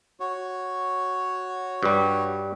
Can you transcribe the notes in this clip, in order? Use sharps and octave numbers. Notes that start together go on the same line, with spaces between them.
F#4 C#5
G2 G3